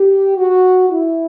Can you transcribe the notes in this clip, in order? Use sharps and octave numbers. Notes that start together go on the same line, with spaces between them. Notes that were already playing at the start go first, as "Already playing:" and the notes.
Already playing: G4
F#4
E4